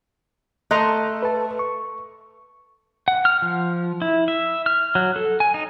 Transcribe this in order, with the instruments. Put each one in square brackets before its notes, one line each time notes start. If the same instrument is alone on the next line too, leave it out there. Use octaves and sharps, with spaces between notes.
[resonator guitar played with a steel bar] A3 [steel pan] D#5 A#5 C6 [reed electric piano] F#6
[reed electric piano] B4 A5
C#6
[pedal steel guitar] F#5
F6
F3
E4
E5
F6
F#3
A4
G#5
D#4